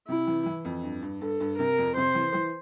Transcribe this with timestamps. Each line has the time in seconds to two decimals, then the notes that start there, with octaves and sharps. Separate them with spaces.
0.08 C3 E4
0.27 E3
0.46 E3
0.65 F2
0.84 G2
1.02 G2
1.21 G2 A4
1.40 G2
1.58 C3 A#4
1.78 F2
1.97 C3 C5
2.15 E3
2.34 E3